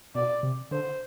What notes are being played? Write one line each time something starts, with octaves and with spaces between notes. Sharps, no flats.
B2 D5
C3
D3 C5